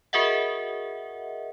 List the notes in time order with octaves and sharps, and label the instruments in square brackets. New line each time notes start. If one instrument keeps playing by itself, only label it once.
[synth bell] F#4 G#4 A#4 D#5 E5 F#5